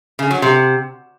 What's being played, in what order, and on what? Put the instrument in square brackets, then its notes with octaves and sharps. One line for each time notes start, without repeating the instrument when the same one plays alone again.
[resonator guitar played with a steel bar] C#3
F#3
C3